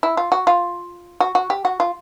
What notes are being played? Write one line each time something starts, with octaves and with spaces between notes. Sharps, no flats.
E4
F4
F#4
F4
F#4
F#4
G4
F#4
F4